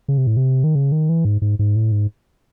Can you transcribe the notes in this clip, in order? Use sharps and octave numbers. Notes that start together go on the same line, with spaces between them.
C#3
C3
A2
C3
D#3
C#3
D#3
E3
G#2
G#2
G#2
A2
G#2